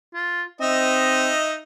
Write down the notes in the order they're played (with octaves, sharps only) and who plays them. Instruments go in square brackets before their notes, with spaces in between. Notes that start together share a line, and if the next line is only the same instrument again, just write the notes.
[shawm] F4
[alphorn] C4 [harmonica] D#4 E5 [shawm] D#5